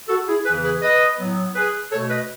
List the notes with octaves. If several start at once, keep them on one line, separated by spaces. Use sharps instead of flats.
F#4 A4
E4 G#4
E2 C#3 E3 G#4 B4
G#4 B4
B4 D#5
A2 F#3 B3
G#4 B4
B2 A3 A4 C#5
B4 D#5